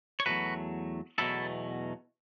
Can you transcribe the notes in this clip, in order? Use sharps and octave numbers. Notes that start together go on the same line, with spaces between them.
C#5
E2 B2 F#3 A3 F#4 B4
E2 B2 F#3 A3 E4 A4